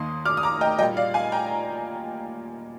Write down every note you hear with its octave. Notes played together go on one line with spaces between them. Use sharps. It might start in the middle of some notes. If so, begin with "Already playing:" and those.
Already playing: D#2 D#3 A#3 C6 D#6
D6 F6
D#6
A#5 D6
D#5 G5
A#2 G3 A#3 D#5 G5
D5 F5
F5 G#5
G5 A#5